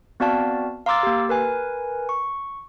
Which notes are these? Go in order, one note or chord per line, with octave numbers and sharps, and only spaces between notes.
B3 C4 F#4 D5 F5 A5
F5 A#5 C6 D6 E6 A6
A#3 G4
A#4 B4 G#5
C#6